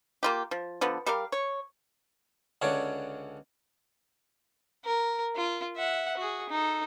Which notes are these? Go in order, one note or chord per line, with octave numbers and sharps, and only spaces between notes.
A#3 F4 G4
F3
D3 F3 B3
G3 G4 A#4 F5
C#5
C#2 D3 C#4 D4
A#4
F4
E5 F#5
F#4 G#4
D#4 A4